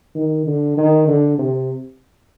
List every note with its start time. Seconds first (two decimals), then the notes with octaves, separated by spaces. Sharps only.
0.15 D#3
0.46 D3
0.77 D#3
1.07 D3
1.38 C3